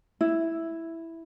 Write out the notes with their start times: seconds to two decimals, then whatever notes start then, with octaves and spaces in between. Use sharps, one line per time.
0.21 E4